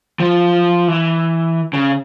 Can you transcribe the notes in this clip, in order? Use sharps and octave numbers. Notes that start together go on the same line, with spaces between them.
F3
E3
C#3